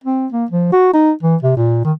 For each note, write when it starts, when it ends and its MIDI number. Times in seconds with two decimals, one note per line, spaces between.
0.04 0.27 60
0.33 0.46 58
0.51 0.71 53
0.73 0.92 66
0.93 1.12 63
1.23 1.36 52
1.43 1.56 48
1.57 1.81 46
1.85 1.93 51